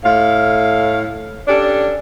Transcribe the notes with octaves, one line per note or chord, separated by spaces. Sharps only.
A2 F5
C#4 D4 G4 A4